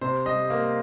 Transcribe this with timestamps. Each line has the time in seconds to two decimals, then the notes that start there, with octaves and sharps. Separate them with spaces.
0.01 C3 C5
0.25 G3 D#5
0.50 A#3